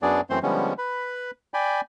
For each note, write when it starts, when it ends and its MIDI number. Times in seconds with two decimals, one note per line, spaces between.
0.02 0.21 42
0.02 0.21 54
0.02 0.21 59
0.02 0.21 62
0.02 0.21 68
0.02 0.21 74
0.30 0.39 42
0.30 0.39 52
0.30 0.39 57
0.30 0.39 60
0.30 0.39 72
0.30 0.39 84
0.43 0.73 50
0.43 0.73 53
0.43 0.73 55
0.43 0.73 56
0.43 0.73 59
0.43 0.73 61
0.78 1.31 71
0.78 1.31 83
1.54 1.81 74
1.54 1.81 79
1.54 1.81 80
1.54 1.81 83